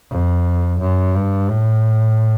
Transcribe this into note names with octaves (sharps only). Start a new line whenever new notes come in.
F2
F#2
G2
A2